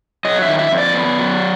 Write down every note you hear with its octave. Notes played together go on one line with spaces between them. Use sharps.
F#3 D#5
E5
D#3
E5
F2
D5
B3
F#3